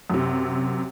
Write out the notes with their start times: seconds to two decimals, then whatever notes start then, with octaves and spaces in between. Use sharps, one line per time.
0.10 F#2 C3